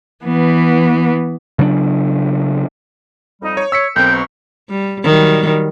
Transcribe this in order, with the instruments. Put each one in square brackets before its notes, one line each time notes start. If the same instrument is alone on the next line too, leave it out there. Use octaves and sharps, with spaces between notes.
[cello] E3 B3
[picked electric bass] C#3 F#3 C4 D4
[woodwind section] F2 G3 D#4
[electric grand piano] C#5
[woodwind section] C#5 [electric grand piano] E6 B6 C#7
[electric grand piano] B1 C4 [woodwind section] A4 A#4 G5 [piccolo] G6
[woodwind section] B2 A#5 C#6
[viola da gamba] G3
D#3 F#3 G3